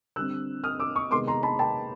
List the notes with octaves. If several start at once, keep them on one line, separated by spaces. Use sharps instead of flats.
D3 G3 C4 E6 F#6
D#6 F6
D6 E6
C#6 D#6
C3 D#3 G#3 B3 C6 D6
A#5 C6
A5 B5
G5 A5